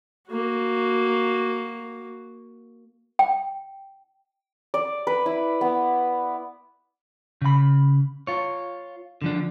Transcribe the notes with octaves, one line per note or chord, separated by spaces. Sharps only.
A#3 F#4
G5
D5
B4
E4
B3
C#3 B5
F4 C#5
D3 F3 D4